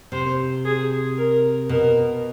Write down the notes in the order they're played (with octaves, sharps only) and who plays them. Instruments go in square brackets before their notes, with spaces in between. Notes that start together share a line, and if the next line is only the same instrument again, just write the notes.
[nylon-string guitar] C3 [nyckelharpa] C5
[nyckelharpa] G#4
A#4
[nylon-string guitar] B2 [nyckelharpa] A#4